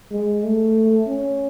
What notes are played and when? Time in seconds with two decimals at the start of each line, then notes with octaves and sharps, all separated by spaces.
0.12 G#3
0.43 A3
1.08 C#4